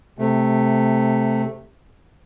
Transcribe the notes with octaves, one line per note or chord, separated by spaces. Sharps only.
C3 A3